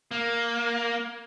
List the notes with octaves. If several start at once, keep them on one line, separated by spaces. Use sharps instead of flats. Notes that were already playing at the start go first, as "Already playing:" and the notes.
A#3